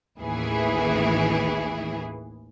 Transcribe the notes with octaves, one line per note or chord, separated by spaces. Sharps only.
A1 D#2 E3 E4 G#4